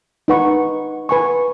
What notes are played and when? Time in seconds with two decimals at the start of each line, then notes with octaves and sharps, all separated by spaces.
0.28 D#4 B4 F#5 C#6
1.09 B4 G#5 C#6